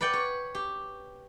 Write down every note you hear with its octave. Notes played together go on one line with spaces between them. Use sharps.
B4 D5 F#5 G5
C#5
G4